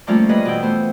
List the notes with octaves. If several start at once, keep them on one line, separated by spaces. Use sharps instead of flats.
F3 G3 A3 A#3 C#4 F4
G2 G#4 B4 D#5
B2 E3 G5
A3 B3 C5